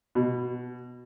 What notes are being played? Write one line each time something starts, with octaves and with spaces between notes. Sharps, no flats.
B2